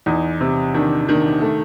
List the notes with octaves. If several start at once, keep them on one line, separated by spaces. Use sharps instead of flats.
E2 D#4
C3
D#3 D4
D#3 D4
A3